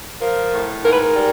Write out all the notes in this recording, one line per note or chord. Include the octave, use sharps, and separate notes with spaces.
F3 A#4
A2
G#2 A#4
B4
A#4
G3